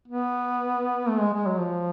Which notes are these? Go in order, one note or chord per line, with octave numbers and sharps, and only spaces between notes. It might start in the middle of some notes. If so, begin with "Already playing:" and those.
B3
A3
G#3
G#3
F#3
F3